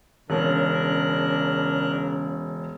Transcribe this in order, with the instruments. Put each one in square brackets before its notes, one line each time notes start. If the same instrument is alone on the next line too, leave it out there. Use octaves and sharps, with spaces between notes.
[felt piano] E1 C#4 [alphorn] C#3 [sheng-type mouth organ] D4 A#4 F#6